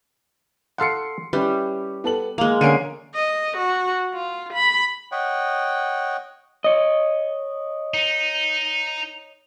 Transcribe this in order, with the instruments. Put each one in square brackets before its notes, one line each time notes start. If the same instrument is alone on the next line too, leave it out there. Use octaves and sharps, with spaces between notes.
[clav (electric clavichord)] A4 F5 F#5 [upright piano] C6 C7 C#7
[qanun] G3 [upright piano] C#4 E4 [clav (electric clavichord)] B4
[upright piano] B3 A4 F#7
[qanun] G#3 A#3 [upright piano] F7 F#7
[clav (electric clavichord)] D3 A#3 C#4 [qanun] C#6 [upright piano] C7 D7 D#7
[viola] D#5
F#4
F4
B5
[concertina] C#5 D#5 F#5 G5
[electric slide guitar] C#5 D#5
[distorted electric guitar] D#4